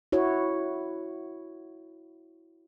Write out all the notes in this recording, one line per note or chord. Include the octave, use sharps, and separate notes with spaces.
E4 F#4 C#5